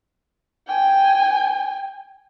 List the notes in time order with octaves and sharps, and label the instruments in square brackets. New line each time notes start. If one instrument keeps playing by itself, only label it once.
[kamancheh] G5 G#5